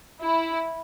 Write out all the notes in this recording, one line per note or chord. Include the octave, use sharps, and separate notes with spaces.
E4